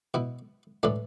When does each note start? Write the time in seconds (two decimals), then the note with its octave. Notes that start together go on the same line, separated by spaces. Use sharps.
0.14 B2 E4
0.83 A2 E3 D4